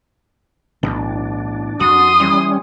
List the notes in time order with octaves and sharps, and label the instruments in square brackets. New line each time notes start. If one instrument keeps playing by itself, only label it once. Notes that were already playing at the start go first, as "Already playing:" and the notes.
[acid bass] B1 [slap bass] A2 E3 B3 [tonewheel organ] D4
[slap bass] F2 [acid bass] F#4 [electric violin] C6 D#6
[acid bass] E3 [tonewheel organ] G3 C#4